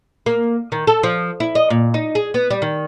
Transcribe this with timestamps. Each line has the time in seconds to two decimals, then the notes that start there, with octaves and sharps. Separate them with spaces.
0.26 A#3
0.72 D#3
0.87 A4
1.03 F3
1.40 E4
1.55 D#5
1.70 A#2
1.94 D#4
2.15 G#4
2.34 B3
2.50 G3
2.62 D#3